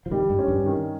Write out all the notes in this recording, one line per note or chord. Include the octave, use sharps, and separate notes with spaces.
F3
D#3 G3
G2
C#4
G2
D#3